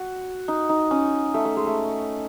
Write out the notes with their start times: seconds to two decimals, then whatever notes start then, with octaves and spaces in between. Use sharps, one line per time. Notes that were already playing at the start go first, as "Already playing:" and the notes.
Already playing: F#4
0.48 D#4
0.69 D#4
0.91 C#4
1.34 A3
1.45 A3
1.57 G#3
1.67 A3